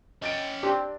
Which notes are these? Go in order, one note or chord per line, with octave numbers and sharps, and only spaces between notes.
C#4 D#5 G5 A6 D7
C4 D4 G4